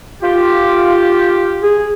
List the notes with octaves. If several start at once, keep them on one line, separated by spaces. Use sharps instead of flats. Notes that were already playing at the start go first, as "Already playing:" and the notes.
F4 G4
G#4